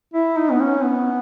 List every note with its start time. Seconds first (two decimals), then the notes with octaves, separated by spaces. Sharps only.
0.13 E4
0.37 D#4
0.51 B3
0.60 C#4
0.84 B3